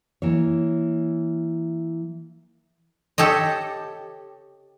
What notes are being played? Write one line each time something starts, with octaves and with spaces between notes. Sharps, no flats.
E3 A#3 C#5
G4 A4 C#5 D#5